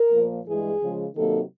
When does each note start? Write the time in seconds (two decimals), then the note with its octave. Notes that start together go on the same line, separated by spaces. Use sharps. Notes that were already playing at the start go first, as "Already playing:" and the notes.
Already playing: A#4
0.12 A#2 F3 A#3
0.46 G2 E3 G#3 G#4
0.80 C#3 F3 G#3
1.14 C3 D#3 F#3 A#3 D#4 A4